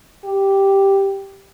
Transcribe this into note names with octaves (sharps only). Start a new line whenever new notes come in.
G4